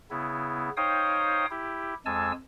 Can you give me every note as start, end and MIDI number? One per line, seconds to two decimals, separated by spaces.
0.11 0.70 49
0.11 0.70 59
0.11 0.70 64
0.77 1.46 63
0.77 1.46 72
0.77 1.46 73
0.77 1.46 77
0.77 1.46 79
0.77 1.46 87
1.51 1.94 64
1.51 1.94 67
2.06 2.32 41
2.06 2.32 56
2.06 2.32 80
2.06 2.32 81
2.06 2.32 88